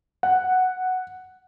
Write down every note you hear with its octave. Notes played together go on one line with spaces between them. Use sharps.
F#5